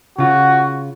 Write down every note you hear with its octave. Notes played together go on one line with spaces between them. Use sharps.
C#3 F4 F#4